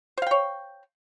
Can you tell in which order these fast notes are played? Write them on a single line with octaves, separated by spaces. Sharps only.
C5 F5 G5 C#5